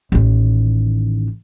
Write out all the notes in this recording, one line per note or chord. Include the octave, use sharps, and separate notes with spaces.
A1 D#3